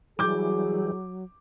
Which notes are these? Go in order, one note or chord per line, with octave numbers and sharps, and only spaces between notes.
E3 F#3 G3 E4 F#4 G#4 D6 G6